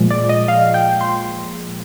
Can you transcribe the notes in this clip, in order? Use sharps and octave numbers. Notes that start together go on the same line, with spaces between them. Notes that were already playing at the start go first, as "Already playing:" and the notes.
Already playing: A#2 F3 G#3
D5
D#5
F5
G5
C6